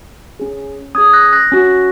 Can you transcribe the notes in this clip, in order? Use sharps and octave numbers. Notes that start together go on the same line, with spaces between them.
C#4 G#4
C#4 G#4 D#6 G#6
F#6 A#6
F#6 A#6
C#4 F#4